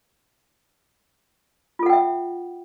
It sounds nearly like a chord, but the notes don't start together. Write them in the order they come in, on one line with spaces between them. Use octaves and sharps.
F4 A4 F#5 G5 E5